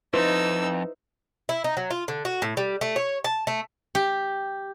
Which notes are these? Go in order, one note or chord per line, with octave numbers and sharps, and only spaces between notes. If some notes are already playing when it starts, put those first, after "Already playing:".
F2 D#4 E4 B4 C5 E6
E4
D#4
F#3
F4
D3
F#4
A2
G3
A3
C#5
A5
A3
G4